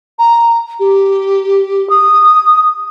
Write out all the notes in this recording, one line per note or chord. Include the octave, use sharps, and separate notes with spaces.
A#5
G4
D#6